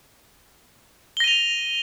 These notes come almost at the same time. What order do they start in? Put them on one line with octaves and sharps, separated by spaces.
G7 A#6 D#7 F7